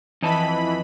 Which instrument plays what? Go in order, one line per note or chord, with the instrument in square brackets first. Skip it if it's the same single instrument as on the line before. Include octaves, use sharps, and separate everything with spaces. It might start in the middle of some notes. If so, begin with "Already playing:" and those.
[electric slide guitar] F2 D#5 A5 [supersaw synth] E3 B5